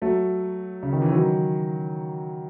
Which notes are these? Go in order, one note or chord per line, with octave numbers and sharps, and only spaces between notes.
F#3 A3
C#3
D#3
E3
D#3 F#3